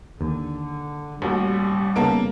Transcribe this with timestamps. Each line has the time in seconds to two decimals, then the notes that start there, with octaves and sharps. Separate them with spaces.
0.21 D#2 D3
1.22 A1 D#2 G3 F#4 A#4
1.96 C#3 A#3 B3 D#4 A4 D7